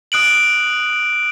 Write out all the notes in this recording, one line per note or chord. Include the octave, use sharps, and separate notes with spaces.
D#6 F#6 D7 F#7